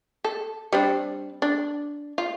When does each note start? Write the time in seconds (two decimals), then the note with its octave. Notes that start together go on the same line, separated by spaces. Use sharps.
0.24 A4
0.73 G3 C4 D4
1.42 D4
2.18 F4